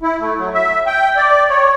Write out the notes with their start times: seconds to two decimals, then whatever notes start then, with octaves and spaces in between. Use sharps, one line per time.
0.02 E4
0.20 A3
0.38 F#3
0.54 E5
0.87 G5
1.17 D5
1.50 C#5